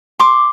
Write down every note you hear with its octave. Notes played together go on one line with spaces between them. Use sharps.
C6 D6